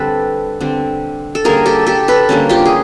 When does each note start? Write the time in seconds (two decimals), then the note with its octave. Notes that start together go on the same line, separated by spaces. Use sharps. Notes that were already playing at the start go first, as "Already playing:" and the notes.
Already playing: D3 G3 C4 A4 B4
0.60 D3 G3 C4
1.35 A4
1.45 D3 G3 A#3 C#4 G#4 A#4
1.66 G4 A4
1.87 G4 A4
2.08 A4 B4
2.29 D3 G3 A#3 C#4
2.49 F4 G4
2.66 G#4